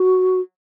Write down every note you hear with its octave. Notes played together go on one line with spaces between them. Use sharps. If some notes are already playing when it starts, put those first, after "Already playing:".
Already playing: F#4